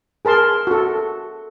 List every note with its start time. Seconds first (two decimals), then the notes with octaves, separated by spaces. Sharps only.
0.25 G#4 A#4 A5 C6
0.67 F#4 A4